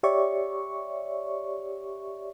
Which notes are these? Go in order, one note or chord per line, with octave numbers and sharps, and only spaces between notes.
G4 C#5 D5 E5 C#6